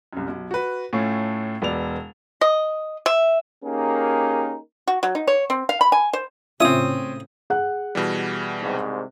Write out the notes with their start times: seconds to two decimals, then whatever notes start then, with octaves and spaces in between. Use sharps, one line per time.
0.13 C2 F#2
0.28 B1
0.51 F#4 B4
0.93 A2 A3 C#4 F4
1.62 E1 B3 D5 F7
2.41 D#5
3.06 E5
3.64 A#3 C#4 D#4 G4 G#4 A#4
4.88 F#4
5.03 F#3
5.15 D#4
5.27 C#5
5.50 C4
5.69 F5
5.81 B5
5.92 G#5
6.13 C5
6.60 A2 C#3 C4 C#4 F4 E5 D#6
7.50 G#4 F#5 F#6
7.95 B2 E3 G3
8.62 C2 G#2 C3